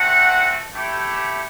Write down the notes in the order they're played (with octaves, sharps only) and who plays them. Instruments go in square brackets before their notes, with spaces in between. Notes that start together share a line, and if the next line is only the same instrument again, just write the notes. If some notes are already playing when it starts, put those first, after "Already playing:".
Already playing: [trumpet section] A3 C4 F#4 F#5
A3 E4 G4